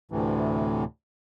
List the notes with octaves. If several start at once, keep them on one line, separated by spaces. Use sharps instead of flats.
D2 A2 C3 E3